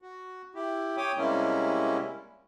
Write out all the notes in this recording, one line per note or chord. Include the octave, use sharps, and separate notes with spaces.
F#4
E4 G4
C#5 G5 D6 D#6
C3 G3 G#3 A#3 C#4 E4